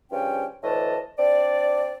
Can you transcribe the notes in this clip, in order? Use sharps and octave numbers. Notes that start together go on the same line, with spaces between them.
G2 C#3 F3 C#4 G5
D2 A2 E3 D#5 A5
C4 D4 D5